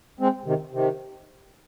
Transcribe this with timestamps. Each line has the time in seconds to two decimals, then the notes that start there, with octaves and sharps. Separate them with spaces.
0.20 G#3 C4
0.45 C3 D#3
0.72 C3 D#3